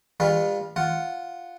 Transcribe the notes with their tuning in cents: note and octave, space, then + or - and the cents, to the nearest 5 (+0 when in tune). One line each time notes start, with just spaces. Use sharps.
G3 +40 F4 +0 B4 -25
F4 +0 F#5 +0